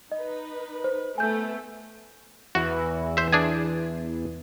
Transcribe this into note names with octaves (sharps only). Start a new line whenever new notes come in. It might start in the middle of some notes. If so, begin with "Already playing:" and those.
D#4 B4 D#5
C5
A3 B3 G#5 G6
E2 E3 F#4
C5 E5
D4 G#4 G#5